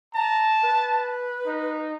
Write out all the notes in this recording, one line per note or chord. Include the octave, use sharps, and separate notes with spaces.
A5 A#5
B4
D#4